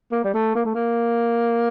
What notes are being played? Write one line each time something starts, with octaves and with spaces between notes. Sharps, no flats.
A#3
G3
A3
A#3
A3
A#3